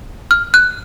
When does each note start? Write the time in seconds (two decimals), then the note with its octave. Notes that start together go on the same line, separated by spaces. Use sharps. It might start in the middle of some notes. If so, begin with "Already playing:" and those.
0.31 F6
0.54 F#6